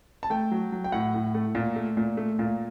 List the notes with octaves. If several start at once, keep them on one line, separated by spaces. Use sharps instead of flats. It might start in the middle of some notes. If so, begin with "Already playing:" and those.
A5
A3 G5
F#3
F#3
G5
A2 F#5
A2
A3
A#2
A3
A#2
A3
A#2